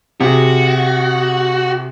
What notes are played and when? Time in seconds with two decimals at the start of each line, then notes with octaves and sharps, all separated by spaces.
0.21 C3 F#4 G#4